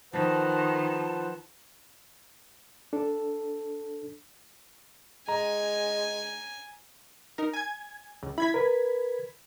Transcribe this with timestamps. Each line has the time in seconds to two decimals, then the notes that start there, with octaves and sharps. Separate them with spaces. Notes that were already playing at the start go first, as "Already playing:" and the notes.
0.13 D#3 F3 B4 C5 F#5 A5
0.49 A5
2.93 D4 A4
5.28 G#3 G#5 A#5
7.38 D#4 A#4
7.53 G#5 G#6
8.23 C#2
8.38 E4 B5 G#6 B6
8.54 A#4 B4